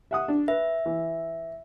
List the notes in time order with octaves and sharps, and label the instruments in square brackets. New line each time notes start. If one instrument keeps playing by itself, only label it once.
[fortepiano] E5 F#5 D#6
D4
[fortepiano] B4 [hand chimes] E5
[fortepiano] E3